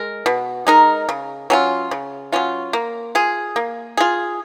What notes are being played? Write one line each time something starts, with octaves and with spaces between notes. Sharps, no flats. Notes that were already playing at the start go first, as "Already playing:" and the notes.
Already playing: G#3 A#4
B2
G#3 D#4 A#4
C#3
F#3 C#4 F4
C#3
F#3 C#4 F4
A#3
F4 G#4
A#3
F4 G#4